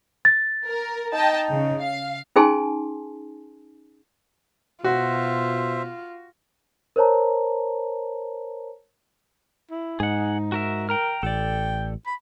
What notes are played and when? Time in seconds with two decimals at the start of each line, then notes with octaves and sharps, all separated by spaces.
0.25 A6
0.66 A#4
1.13 D#4 D#5 G5 A5
1.49 C#3
1.80 F5
2.36 C#4 D#4 G#4 G#5 A5 C6
4.84 B2 F4 F#4 C5 E5
6.96 A#4 C5 C#5 A5 A#5
9.70 E4
10.00 G#2 D#4 G#4 F#5
10.52 F#4 A#4 E5
10.89 A#4 G5 A#5 F6
11.23 A1 A4 D5 G5
12.06 B5